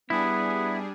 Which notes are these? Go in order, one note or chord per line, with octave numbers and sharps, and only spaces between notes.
G3 B3 D4 E4 G#4